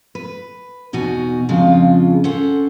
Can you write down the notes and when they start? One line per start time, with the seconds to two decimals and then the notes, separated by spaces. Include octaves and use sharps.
0.15 B4
0.93 E2 B2 D#4 F#4 G#5
1.49 F2 C#3 F3 G#3 F4
2.24 C#4 A4 C5 F#5